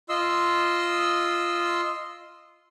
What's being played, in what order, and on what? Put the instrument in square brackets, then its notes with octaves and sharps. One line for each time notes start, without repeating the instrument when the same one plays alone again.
[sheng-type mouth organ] F4 D#5 C6 E6